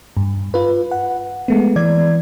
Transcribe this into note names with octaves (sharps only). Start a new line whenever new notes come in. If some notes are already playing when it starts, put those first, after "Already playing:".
G2
F4 B4
F#5
G#3 A3 B3
E3 D5 G#6